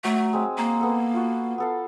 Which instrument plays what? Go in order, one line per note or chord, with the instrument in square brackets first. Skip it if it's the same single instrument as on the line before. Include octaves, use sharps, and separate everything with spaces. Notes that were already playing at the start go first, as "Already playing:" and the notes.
[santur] F#3 [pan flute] A3
[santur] G#3 C4
[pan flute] A#3 [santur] A#5
[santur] B3 A4
F4 F#4
B3 A4 F5